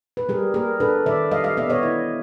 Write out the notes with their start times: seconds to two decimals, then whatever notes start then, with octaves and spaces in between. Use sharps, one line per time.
0.17 B4
0.29 G3 G#4 A#4
0.54 A#3 G#4 A#4
0.80 D4 A4 B4
1.06 D#3 D5 E5
1.31 G3 D#5 F5
1.44 D#5 F5
1.57 B3 D5 E5
1.70 C#5 D#5
1.83 E4